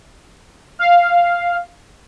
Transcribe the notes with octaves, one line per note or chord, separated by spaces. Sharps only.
F5